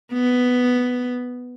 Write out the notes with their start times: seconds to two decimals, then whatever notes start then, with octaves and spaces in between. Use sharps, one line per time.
0.12 B3